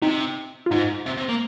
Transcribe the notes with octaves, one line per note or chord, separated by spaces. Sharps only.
C3 D#4
F4
G#2 D#4
C3
C3
A#3